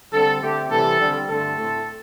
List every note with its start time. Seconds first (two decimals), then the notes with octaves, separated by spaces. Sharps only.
0.13 D3 G3 C4 A4
0.42 D3 A3 C4 G4
0.71 C3 E3 G3 C4 A4
0.99 D3 G3 C4
1.27 G2 D3 A3 C4 A4
1.56 A2 A3 C4